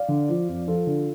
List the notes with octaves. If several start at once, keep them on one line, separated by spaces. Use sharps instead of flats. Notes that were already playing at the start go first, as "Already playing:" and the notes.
Already playing: D5 F5
D3
F3
F2
F3 F4 A4
D3